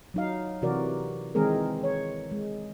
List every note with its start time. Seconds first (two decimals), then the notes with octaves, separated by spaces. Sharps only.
0.14 F#3 D#4 F5
0.62 C3 E3 F#4 A#4 D5
1.35 D#3 E3 G#3 C4 G#4 A#4
1.84 C#5
2.31 G#3